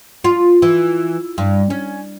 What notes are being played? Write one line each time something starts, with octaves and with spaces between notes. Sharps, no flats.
F4
E3
G2
C#4